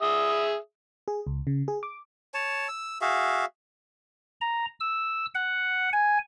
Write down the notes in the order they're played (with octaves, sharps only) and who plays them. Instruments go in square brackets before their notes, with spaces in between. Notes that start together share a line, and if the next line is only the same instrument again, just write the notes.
[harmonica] G#4 E5 D#6
[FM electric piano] G#4
C#2
C#3
G#4
D6
[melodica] C#5 A5
E6
F#4 G#4 E5 F5
[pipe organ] A#5
E6
F#5
G#5